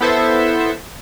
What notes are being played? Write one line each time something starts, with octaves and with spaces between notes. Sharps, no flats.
B3 E4 A4 C5 E5